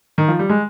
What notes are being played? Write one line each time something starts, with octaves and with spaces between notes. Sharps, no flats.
D#3
F3
G3
G#3